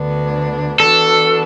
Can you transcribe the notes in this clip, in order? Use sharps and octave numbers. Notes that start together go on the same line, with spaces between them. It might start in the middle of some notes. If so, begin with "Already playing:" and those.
Already playing: D2 D3 B3 D4
E3 B3 D4 F#4 A4